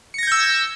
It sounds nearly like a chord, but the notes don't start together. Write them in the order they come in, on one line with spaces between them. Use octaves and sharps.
C#7 A#6 G#6 G6 E6